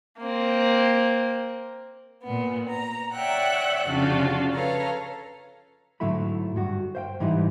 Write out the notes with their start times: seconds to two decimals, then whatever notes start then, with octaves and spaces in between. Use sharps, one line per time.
0.19 A#3 C4
2.22 A#2 B3
2.69 A#5
3.14 C#5 D5 E5 F#5 G5 F#6
3.88 F2 C#3 D4 F4 F#4
4.54 A4 B4 C#5 F5 A#5
6.00 G#2 D3 F#3 A3 E4 B5
6.56 G2 F#4
6.95 C5 F5 G5
7.20 G#2 E3 G3 D#4 E4